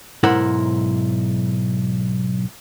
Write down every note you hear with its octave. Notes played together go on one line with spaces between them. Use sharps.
B1 G#2 E4 A#4 C5 F#5